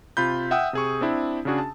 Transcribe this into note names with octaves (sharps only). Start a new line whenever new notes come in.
C3 F4 B5 G6
E5 F#5 G5 D#6 E6
C3 G#4 C#6
C4 D4 E4
C#3 C#4 D4 F#4 G#4
A5